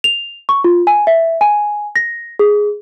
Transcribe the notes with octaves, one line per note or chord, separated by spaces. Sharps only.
F7
C#6
F4
G#5
E5
G#5
A#6
G#4